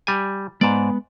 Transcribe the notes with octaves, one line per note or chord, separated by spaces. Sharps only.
G3 G#5
G#2 G#3 B3 B4 D5